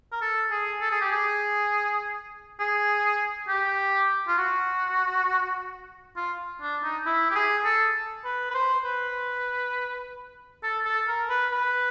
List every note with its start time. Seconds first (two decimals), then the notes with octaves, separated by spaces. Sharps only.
0.12 A#4
0.21 A4
0.50 G#4
0.81 A4
0.91 G#4
1.01 G4
1.11 G#4
2.59 G#4
3.48 G4
4.28 F4
4.38 F#4
6.16 F4
6.61 D4
6.83 D#4
7.06 E4
7.30 G4
7.35 G#4
7.65 A4
8.25 B4
8.50 B4
8.54 C5
8.84 B4
10.63 A4
10.85 A4
11.08 A#4
11.30 B4
11.52 B4